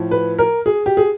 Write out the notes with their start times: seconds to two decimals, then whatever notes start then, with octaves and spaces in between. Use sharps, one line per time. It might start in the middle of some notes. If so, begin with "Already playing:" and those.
Already playing: A2 F3
0.11 B4
0.39 A#4
0.66 G#4
0.86 G4
0.97 G#4